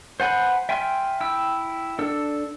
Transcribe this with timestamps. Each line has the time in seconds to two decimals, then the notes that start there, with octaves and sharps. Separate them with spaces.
0.20 C5 F#5 G#5 B5
0.69 E5 G5 G#5 C6 F6
1.21 E4 G5 E6
1.99 D4 A4 E6